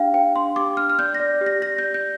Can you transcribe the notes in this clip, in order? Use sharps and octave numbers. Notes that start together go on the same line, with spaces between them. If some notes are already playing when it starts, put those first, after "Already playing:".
Already playing: D4 G4 F5 G5
C5 G5
D4 C6
G4 D6
D4 F6
F6
D5 G6
A#6
D5
G4
A#6
G4 A#6
G6
D5
G6